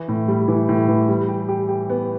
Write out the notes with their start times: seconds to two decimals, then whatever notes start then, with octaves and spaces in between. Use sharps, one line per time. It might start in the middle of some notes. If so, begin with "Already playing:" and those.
Already playing: E3
0.08 A2
0.28 G3
0.48 E3
0.69 A2
0.88 E3
1.09 G3
1.29 G4
1.49 G4
1.69 G4
1.89 B3